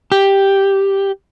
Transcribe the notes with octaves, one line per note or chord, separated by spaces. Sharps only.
G4